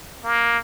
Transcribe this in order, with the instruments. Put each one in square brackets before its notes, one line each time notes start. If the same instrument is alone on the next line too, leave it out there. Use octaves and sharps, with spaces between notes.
[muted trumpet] A#3